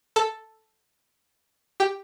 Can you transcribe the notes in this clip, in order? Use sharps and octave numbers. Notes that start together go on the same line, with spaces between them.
A4 A5
G4 G5